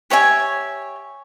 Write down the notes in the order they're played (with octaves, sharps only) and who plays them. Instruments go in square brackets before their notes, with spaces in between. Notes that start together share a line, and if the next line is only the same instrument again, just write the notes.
[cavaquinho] G4 C#5 E5 G#5